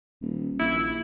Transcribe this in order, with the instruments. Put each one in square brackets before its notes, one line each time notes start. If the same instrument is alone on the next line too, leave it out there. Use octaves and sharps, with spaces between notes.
[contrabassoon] D#1
[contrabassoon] A#1 [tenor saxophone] E4